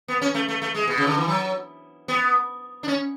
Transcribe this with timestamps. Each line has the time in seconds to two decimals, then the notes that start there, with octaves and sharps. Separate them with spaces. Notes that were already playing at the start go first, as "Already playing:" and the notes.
0.08 B3
0.22 C#4
0.35 A3
0.48 A3
0.62 A3
0.75 G#3
0.87 B2
0.98 C#3
1.07 D3
1.17 E3
1.28 F#3
2.08 B3
2.83 D4
2.88 C#4